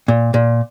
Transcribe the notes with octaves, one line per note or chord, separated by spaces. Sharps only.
A#2
A#2